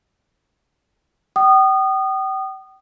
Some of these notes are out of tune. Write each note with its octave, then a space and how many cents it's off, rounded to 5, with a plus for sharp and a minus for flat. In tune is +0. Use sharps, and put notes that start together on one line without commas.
G5 -35 D#6 -25